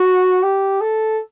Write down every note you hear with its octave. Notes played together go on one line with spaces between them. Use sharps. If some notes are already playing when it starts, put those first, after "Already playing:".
Already playing: F#4
G4
A4